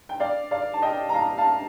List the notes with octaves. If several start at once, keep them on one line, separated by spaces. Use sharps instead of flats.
G5
D5 F5
D5 F5
A5
D#5 G5
A#5
F5 A5
F5 A5